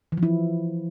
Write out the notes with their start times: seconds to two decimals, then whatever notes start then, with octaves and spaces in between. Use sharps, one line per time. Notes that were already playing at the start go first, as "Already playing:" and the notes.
0.12 E3
0.17 F3
0.23 E4